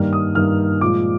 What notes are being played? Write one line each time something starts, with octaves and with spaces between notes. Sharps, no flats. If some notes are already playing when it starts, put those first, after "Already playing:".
Already playing: G2 D#3 G3 A#3 F6
D#6
G2 D#3 G3 A#3 F6
A#2 F3 G#3 D6